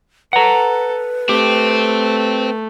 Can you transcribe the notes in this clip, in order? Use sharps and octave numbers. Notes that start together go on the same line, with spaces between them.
A4 B4 F#5 A#5
A3 C4 G4